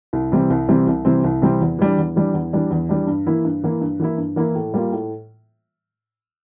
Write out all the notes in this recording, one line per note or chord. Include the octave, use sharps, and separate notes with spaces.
C2
C3 E3 G3 C4
C2
C3 E3 G3 C4
C2
C3 E3 G3 C4
C2
C3 E3 G3 C4
E2
E3 G3 D4
E2
E3 G3 D4
E2
E3 G3 D4
E2
E3 G3 D4
G2
E3 A#3 E4
G2
E3 A#3 E4
G2
E3 A#3 E4
G2
E3 A#3 E4
A2
G3 A#3 F4
A2